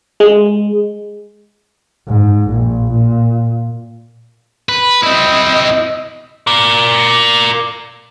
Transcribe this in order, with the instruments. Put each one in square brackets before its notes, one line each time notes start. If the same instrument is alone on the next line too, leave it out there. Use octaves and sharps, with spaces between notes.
[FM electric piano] G#3
[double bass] G#2
A#1
A#2
[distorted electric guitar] B4
[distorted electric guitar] C4 E4 [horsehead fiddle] D#5
[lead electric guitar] A#4 D5